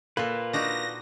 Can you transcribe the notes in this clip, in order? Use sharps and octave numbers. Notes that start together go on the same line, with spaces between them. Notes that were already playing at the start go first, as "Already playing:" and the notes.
A#2 A#3 F4 A4 B4
D4 D#4 F#4 A#6